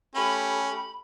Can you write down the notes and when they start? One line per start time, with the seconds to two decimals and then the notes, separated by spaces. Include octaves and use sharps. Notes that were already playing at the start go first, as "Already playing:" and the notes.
0.15 A3 C#4 G4 B5